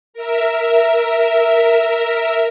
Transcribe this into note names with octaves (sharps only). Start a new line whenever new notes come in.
A#4 E5